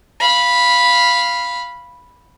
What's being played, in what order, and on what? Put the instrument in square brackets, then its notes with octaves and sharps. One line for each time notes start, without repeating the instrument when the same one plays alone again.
[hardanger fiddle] F5 B5